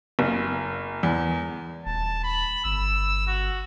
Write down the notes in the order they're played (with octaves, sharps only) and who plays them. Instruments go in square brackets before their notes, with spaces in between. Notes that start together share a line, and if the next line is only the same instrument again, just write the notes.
[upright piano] F#1
E2
[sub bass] D#1 [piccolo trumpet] A5
[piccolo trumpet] B5
[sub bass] G1 [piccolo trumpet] E6
[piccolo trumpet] F#4